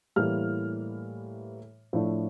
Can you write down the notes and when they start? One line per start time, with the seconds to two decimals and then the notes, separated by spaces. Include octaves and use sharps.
0.16 A2 E3 G3 A#3 F6
1.93 A2 F3 A3 D4